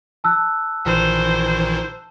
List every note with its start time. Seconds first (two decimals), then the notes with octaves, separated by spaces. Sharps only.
0.24 A5 E6 F#6
0.85 A#1 D#3 E3 C5